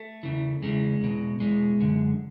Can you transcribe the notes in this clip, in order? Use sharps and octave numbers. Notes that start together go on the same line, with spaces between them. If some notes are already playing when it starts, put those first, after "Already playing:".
Already playing: A3
E2 C#3 E3
E2 C#3 E3 G#3
E2 B2
E2 B2 G#3
F#2 D3